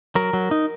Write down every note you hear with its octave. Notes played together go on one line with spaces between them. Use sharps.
F#3 A#4
F#3
D#4